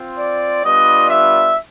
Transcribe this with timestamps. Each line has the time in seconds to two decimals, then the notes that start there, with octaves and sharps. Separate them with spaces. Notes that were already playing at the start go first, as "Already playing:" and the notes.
Already playing: C4 F4
0.19 D5
0.65 G3 B3 D4 F4 D#5
1.10 E5